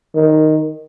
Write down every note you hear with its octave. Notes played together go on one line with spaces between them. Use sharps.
D#3